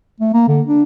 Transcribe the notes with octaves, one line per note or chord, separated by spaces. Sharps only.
A3
A#3
D3
D4